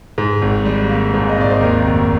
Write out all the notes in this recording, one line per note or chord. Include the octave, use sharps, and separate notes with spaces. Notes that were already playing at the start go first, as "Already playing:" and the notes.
G#2
G#1
G3
A#3
G#2
D#5
G#1 D5
C5
D#2 A#4
F1